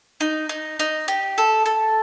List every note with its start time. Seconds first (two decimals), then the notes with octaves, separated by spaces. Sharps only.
0.20 D#4
0.49 D#4
0.79 D#4
1.08 G4
1.38 A4
1.66 A4